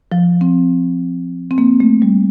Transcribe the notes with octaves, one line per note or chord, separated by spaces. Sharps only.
F3
C4
C4
A#3
A3
G3